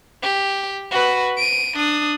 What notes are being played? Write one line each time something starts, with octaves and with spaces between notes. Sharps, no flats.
G4
F#4 B4
D7 D#7
D4 D#6